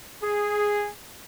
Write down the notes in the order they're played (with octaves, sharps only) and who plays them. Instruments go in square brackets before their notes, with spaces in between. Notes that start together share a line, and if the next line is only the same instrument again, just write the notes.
[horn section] G#4